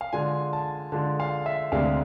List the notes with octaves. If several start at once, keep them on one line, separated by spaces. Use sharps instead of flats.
F5
D3 G#3 D4 F4 G#5
A5
D3 G#3 D4 F4 A5
F5
E5
D2 C3 G#3 D4 F5